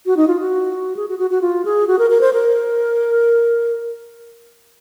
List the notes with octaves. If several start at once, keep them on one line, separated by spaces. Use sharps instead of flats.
F#4
D#4
F4
F#4
G#4
F#4
F#4
F#4
F4
G#4
F#4
A#4
A#4
C5
A#4